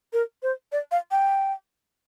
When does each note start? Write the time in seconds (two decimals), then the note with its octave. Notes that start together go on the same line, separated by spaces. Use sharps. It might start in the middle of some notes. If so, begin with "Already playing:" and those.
0.13 A#4
0.43 C5
0.72 D5
0.92 F5
1.11 G5